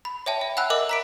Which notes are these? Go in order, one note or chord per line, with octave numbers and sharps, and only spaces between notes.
B5
C#5 E5 G5 A5
E5
F#5 G#5 B5 E6 F#6
A#4 D#5 E5 D6 E6
A#5 B6 D7